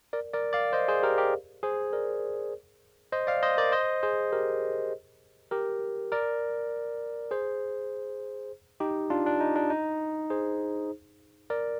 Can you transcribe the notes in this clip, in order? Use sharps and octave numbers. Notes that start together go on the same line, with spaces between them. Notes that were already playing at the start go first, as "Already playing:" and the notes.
A#4 D5
A#4 D5
D5 F5
C5 D#5
G#4 C5
G4 A#4
G4 A#4
G#4 C5
A#4 D5
C5 D#5
D5 F5
C5 D#5
A#4 D5
C5 D#5
G#4 C5
G4 A#4
G4 A#4
A#4 D5
G#4 C5
D#4 G4
D4 F4
D4
D#4
D4
D#4
G#4 C5
A#4 D5